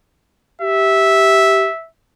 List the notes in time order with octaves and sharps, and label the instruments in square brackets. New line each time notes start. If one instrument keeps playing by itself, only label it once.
[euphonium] G4 [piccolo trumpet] E5